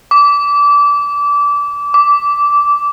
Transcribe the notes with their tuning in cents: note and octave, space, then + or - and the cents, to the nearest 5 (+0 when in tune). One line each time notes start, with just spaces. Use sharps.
D6 -25
D6 -15